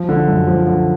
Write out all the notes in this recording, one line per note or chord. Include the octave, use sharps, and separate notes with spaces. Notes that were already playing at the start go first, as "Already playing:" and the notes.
Already playing: F3
D3
F#2
F3
D3